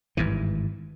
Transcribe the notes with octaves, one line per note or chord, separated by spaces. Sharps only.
G#1 G2 E3